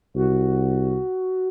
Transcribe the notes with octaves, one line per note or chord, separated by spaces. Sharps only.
C2 F#4